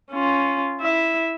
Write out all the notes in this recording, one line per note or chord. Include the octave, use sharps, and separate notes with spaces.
C#4 F4
E4 E5